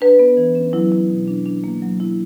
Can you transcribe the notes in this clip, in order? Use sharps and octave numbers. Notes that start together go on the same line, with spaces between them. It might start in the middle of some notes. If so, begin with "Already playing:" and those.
D4 B4
B3
E3
C#4
F#3 E4
E4
B2
D4
D4
A#3
F#3
E4